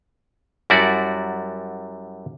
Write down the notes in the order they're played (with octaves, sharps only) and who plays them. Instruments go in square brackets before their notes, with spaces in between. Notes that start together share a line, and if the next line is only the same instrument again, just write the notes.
[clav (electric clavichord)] F#2 G3 E4 F#4 D5